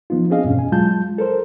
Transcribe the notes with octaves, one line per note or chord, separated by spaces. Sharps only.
F3 B3 D#4 F4
C4 D4 G#4 D#5 F5
E2 G2 B2 C#4
G#5
F#3 G#3 F4 A5 G6
A4 A#4 C5